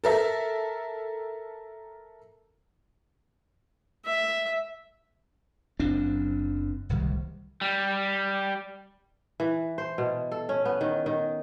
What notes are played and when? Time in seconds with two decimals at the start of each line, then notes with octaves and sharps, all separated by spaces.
0.04 A4 A#4 E5
4.06 E5
5.80 F#1 F#2 C4 D4
6.89 D1 C2 D#3 G3
7.61 G3
9.40 E3
9.78 C5
9.98 B2
10.32 A4
10.49 C#4
10.65 B3
10.81 D#3
11.06 D#3